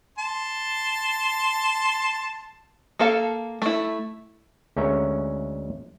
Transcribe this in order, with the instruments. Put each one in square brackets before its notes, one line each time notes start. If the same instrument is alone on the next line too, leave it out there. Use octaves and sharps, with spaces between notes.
[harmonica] A5 C6
[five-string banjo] A#3 A4 F5 A5
A3 E4
[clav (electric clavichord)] D2 G#3 C#4 A#4 C#5 E5